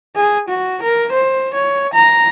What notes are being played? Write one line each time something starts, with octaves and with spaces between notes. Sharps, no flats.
G#4
F#4
A#4
C5
C#5
A#5